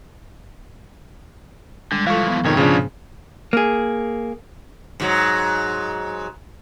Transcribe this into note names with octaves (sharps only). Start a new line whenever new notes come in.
D3 G3 G#3
E3 F3 F4 A4 F5 C#6
B3
C2 F2 G#2 B2 D#3 C#5 G5
C#3 F3 D4 G#4 C5
A#3 G#4
G#2 F#3